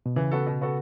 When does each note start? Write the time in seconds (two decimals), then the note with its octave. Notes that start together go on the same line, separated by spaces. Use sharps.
0.06 B2
0.16 C#3 E3
0.31 B3 F#4 A4
0.46 B2
0.61 B3 F#4 A4